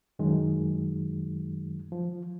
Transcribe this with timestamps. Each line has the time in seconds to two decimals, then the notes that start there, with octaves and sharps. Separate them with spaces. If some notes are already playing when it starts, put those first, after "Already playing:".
0.19 F#2 D#3 F#3 G#3
1.92 F3